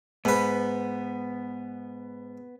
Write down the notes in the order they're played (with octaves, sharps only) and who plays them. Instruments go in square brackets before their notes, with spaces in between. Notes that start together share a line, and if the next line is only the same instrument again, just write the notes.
[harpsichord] G#2 B4 [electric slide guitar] B3